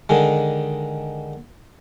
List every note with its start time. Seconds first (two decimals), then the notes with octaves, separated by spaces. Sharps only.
0.09 D3 D#3 G#3